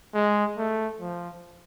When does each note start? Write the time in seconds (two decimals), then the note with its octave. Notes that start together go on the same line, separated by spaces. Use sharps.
0.15 G#3
0.57 A3
1.00 F3